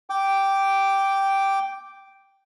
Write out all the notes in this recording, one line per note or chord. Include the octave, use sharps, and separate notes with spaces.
G5 D6